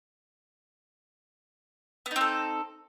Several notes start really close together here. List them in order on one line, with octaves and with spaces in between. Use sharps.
B3 D#4 C4 A4